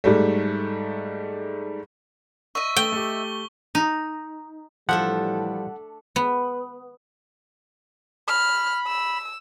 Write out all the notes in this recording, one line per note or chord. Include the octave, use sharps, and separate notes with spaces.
G#2 G3 A3
D#5 E5 C#6
A3 G5 G7
A3 G4
D#4
A2 E3 F3 G3 A3 D4 A4 F#5
B3
B5 F6
E6